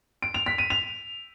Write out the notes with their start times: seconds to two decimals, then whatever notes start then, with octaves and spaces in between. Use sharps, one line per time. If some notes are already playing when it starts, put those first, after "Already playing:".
0.22 D7
0.34 F7
0.46 B6
0.58 D#7
0.70 F7